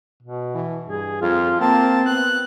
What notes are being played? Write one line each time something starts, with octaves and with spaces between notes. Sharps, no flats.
B2
E3
G2 G#4
F2 F4
A#3 C4 A5
B3 F#6